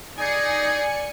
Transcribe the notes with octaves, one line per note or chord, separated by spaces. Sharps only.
D#4 G#4 D5 G#5 C#7